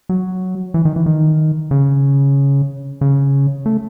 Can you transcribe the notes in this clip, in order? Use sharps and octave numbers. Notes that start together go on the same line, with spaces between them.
F#3
E3
D#3
E3
D#3
C#3
C#3
A3